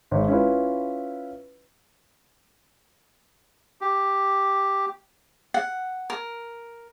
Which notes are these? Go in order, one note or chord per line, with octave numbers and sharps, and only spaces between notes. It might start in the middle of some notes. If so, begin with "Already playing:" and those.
G#1 C#5
C#4 E4 F4 B4
G4
F#5
A#4